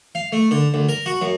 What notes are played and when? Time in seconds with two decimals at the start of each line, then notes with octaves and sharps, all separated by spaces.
0.15 F5
0.32 A3
0.51 D3
0.74 D2
0.89 A#4
1.06 F#4
1.21 F#2